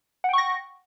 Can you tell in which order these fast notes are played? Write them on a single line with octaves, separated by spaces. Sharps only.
F#5 G5 C#6 A#6